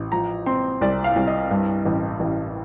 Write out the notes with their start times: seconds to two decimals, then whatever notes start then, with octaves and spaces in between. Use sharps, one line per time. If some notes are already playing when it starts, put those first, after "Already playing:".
Already playing: A1
0.12 F3 A#5
0.46 C4 C6
0.81 C2 D5
1.04 F5
1.16 C2
1.28 D#5
1.51 G2
1.86 A1
2.20 A1